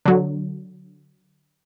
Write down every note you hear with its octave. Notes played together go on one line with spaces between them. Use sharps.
D3 F#3